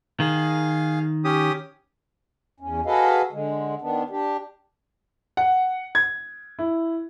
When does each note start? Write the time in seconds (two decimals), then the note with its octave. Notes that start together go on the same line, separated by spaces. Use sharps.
0.20 D#3 G#4 F5
1.24 C#4 G4 D#6
2.60 E2 C#4
2.86 F#4 G#4 A4 B4 D#5 F5
3.32 D3 G#3
3.81 D#3 B3 D4
4.10 D4 G4
5.37 F#5
5.95 G#6
6.59 E4